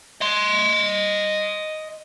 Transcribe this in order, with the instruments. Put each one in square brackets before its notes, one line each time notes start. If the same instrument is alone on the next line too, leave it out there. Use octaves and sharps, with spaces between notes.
[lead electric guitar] D#5 C6